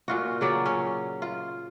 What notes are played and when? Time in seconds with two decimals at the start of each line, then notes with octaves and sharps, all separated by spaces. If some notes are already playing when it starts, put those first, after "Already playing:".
0.08 A#2 F4 F#4
0.41 C#3 F#3 D5
0.66 C#4
1.22 F4